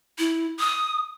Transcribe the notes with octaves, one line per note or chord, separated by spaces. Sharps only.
E4
D#6